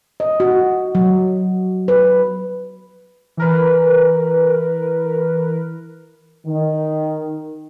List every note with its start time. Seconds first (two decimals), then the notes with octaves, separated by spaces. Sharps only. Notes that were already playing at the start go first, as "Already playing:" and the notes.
0.20 D#5
0.40 F#4
0.95 F#3
1.88 B4
3.37 E3 A#4 B4
6.46 D#3